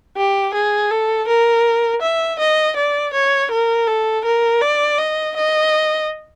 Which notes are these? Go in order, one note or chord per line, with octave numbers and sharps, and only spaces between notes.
G4
G#4
A4
A#4
E5
D#5
D5
C#5
A#4
A4
A#4
D5
D#5
D#5